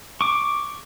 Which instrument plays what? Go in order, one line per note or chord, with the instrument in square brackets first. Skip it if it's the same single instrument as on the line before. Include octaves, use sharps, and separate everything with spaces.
[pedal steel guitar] C#6 D6